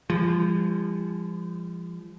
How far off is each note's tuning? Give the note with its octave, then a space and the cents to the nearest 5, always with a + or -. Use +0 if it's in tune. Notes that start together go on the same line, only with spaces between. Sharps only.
F3 -25 G#3 -45